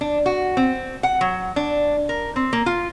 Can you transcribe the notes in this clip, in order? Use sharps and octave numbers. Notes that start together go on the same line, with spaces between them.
D4
F#4
C4
F#5
F#3
D4
A#4
C4
A#3
F4